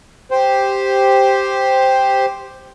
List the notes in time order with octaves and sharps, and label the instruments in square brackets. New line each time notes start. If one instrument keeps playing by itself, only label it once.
[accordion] G4 C5